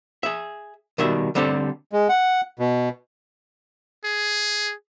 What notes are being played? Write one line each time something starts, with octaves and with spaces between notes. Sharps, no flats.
G#4 E5
B2 D#3 G3 E5
D3 G3 C4 G4 A4
G#3
F#5
B2
G#4